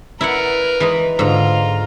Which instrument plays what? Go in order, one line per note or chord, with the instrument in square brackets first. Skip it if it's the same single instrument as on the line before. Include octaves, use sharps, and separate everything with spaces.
[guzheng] E4 D5 F#5 [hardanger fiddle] A#4 B4
[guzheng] E3 G#3 D#4
[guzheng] G#2 D3 [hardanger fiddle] F4 A#5